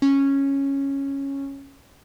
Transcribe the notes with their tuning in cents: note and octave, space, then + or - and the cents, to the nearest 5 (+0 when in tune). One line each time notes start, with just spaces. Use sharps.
C#4 -10